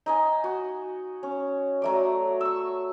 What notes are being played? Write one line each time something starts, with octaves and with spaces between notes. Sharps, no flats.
D#4 D#5 G#5
F#4
C#4
F#3 A3 D5
C#6 E6